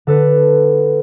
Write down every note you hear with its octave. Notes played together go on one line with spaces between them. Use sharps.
D3 A4 B4